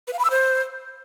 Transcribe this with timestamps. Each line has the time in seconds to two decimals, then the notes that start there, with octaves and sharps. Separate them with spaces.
0.07 B4
0.13 F5
0.19 B5
0.25 E6
0.30 C5